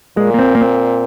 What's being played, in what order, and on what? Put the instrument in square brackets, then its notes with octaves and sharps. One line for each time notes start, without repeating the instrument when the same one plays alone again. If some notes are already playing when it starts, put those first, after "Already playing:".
[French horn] A#2 [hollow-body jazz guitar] G#3
[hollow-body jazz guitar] A#3
C4
A#3
C4